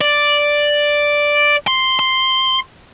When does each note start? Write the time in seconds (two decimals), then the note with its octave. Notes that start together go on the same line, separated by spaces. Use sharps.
0.01 D5
1.67 C6
1.99 C6